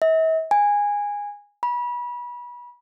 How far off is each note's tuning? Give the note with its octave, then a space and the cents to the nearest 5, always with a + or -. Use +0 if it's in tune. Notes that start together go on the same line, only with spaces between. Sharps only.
E5 -45
G#5 -15
B5 -30